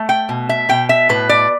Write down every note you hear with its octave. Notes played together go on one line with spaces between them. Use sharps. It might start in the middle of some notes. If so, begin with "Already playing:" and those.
Already playing: A3
G5
B2
E5
B2 G5
E5
A2 B4
D5